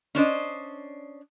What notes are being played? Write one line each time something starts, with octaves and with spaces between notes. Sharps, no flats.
C#4 D4 C5 D#5